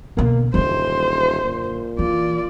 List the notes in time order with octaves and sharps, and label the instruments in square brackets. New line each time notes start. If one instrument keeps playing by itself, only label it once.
[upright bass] B2 D3 [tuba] A#3
[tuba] D#1 [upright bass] F#2 D3 [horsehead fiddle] C5
[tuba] A#2
[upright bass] E3 [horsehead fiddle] F4 D5